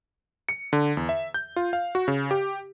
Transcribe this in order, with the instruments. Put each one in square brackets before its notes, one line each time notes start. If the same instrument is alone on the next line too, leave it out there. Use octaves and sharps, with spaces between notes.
[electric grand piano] C#7
D3
E2
E5
G6
F4
F5
F#4
C#3
G4